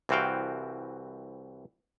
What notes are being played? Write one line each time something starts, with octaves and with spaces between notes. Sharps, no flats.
C2 E3 C4 F#4 F5 G5